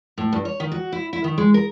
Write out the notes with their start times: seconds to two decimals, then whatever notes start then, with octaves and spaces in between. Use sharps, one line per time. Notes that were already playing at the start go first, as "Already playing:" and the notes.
0.18 A2
0.33 G2
0.45 C#5
0.60 D#3
0.72 F#4
0.92 E4
1.13 E4
1.24 D#3
1.38 G#3
1.54 A#4